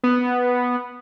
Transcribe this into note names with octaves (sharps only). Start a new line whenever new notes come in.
B3